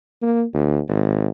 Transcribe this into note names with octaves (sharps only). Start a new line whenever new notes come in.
A#3
D2
G#1